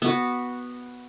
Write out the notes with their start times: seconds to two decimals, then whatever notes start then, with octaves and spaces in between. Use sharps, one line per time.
0.02 B3 F#4